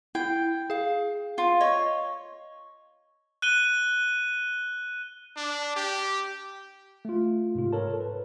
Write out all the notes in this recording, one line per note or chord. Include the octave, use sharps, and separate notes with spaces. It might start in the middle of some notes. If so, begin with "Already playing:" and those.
E4 G5
G#4 F5
F4
C#5 D#5
F#6 D#7 G7
D4
G4
A3 F4
G#2 C3 F4
A4 A#4 C#5 A5
B4